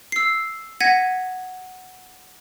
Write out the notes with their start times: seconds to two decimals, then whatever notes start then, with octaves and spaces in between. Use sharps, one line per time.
0.12 E6 C7
0.80 F#5 G#6 A#6 B6 D#7